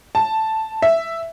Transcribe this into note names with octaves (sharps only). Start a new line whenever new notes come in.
A5
E5